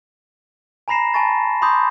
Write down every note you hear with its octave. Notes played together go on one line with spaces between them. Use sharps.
G#5 A#5 B5 A#6 C7 E7
G#5 A5 B5 C#6 A6
B5 C6 D6 D#6 G6